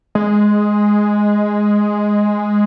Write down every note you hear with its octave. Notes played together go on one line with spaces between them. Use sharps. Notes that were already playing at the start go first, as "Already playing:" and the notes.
G#3